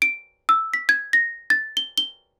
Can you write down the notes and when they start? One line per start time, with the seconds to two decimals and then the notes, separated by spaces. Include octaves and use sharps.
0.02 D7
0.49 E6
0.74 B6
0.89 G#6
1.13 A#6
1.50 A6
1.77 G7
1.98 G7